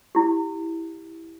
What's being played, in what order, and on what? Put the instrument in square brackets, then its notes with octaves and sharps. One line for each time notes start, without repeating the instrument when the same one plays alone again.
[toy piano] E4 G4